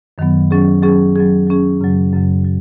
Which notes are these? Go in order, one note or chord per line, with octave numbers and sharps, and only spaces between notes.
F#2 D#3 F#3 B3
F#3 C#4 G#4
F#3 C#4 G#4
F#3 C#4 G#4
F#3 C#4 G#4
F#2 C#3 F#3
F#2 C#3 F#3
F#3